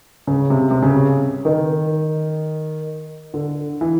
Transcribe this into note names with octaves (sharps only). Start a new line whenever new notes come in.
C#3
C3
C3
C#3
D#3
D3
E3